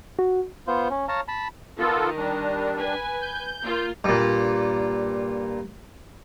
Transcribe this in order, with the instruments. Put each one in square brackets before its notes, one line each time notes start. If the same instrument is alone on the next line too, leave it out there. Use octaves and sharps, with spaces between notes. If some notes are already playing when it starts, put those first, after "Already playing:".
[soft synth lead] F#4
[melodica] B3 F4 C5
C#4
C#5 F5 A5 A#5
A5 B5
[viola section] D#3 [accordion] B3 F4 A4
[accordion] G3 D4
[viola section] B4 G#5
[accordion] G6
[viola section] A#3 F4
[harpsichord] G2 A#2